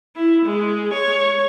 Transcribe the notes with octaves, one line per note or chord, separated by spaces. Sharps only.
E4
G#3
C#5